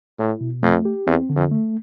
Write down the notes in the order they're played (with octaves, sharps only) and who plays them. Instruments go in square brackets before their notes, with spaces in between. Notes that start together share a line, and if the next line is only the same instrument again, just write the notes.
[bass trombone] A2 [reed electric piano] E4
[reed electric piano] B2
[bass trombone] F2 [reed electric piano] A3
[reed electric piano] G4
[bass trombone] E2 [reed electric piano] C4
[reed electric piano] D3
[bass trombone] F2
[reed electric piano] A3